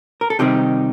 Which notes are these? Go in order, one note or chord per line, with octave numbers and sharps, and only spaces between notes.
A#4
A4
C3 D#3 G3 C4 D#4 G4